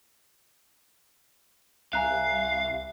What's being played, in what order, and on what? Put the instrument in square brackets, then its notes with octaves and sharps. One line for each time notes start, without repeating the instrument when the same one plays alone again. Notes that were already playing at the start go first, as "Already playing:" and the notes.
[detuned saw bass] C2 [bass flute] E5 [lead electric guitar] F5 [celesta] G#5 A#5 F#6